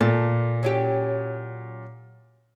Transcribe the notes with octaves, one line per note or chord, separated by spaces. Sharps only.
A#2 A4
F#3 C#4 G4